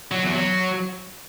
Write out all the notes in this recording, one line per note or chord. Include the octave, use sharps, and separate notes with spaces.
F#3
E2
F#3